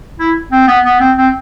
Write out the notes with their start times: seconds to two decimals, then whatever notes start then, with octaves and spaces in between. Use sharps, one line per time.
0.20 E4
0.52 C4
0.68 B3
0.85 B3
1.00 C4
1.17 C4